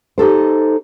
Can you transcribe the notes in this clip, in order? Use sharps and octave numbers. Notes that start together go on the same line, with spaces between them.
D#4 G4 A4 C5